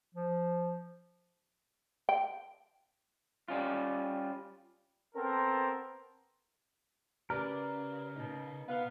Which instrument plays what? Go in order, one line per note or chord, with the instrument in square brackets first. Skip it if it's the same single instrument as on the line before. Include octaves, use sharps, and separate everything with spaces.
[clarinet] F3
[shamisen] G5
[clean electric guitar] G3 C#4 F4
[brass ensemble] B3 C4 A4 A#4
[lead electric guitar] C#3 [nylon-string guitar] G4 B4 D5 [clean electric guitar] A#4
[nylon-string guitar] B2 D#4
[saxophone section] B3 F5 [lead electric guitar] B4 F#5